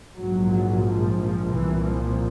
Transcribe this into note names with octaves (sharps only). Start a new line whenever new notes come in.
A#1 G#2 F#3
F3
F3
C2 A#2 E3
F3